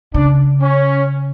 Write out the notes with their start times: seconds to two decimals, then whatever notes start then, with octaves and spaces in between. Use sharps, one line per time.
0.14 C#3 D4
0.61 C#4